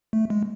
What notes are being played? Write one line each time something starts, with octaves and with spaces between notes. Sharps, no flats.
A3
G#3